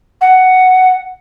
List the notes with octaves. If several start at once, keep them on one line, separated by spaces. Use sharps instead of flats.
F#5